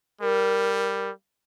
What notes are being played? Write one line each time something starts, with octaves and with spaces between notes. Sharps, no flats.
G3 A#4